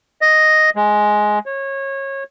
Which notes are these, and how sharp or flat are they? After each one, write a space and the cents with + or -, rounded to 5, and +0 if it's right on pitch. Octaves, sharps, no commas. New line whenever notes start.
D#5 +0
G#3 +10
C#5 -25